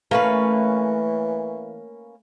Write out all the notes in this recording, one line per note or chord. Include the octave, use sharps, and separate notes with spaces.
E3 A3 A#3 C#4 B4